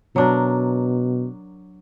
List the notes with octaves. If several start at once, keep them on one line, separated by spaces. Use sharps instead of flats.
B2 F#3 D4 A#4